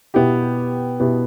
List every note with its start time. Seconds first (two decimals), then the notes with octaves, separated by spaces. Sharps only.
0.14 B2 B3 E4 G4
1.00 B2 B3 E4 G4